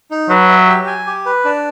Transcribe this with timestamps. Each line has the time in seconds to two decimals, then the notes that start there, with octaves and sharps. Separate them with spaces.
0.11 D#4
0.29 F#3 B4
0.49 E5
0.68 G4
0.87 G#5
1.07 G4
1.26 B4
1.45 D4